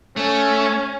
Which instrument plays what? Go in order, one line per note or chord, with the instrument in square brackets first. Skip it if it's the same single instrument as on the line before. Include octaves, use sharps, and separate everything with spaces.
[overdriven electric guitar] A3 [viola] C#4